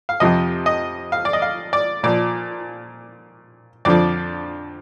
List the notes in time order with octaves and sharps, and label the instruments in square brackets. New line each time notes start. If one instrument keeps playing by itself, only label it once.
[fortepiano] F5
F2 C3 F3 D#5
D#5
F5
D5
D#5
F5
D5
A#2 F3 D5
F2 D3 F3 D5